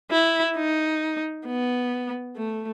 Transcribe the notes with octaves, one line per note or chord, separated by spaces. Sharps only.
E4
D#4
B3
A3